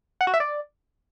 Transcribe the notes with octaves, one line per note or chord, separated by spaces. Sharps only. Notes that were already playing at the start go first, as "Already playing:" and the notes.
F#5
F#4
E5
D5